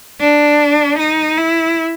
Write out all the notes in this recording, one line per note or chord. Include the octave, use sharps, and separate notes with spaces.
D4
D#4
E4